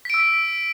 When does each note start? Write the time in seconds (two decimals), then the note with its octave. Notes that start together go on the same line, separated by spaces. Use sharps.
0.05 B6
0.10 D7
0.14 E6